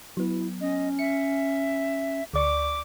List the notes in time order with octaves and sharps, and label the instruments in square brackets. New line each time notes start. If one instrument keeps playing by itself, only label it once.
[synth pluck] F#3 B3 [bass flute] E4
[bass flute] C#4 [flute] D#5
[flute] E5 [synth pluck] C#7
[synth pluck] D2 D5 C#6 [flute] D6